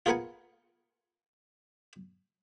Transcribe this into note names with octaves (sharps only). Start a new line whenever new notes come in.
F4 G#4 A#4 B4 F#5 G#5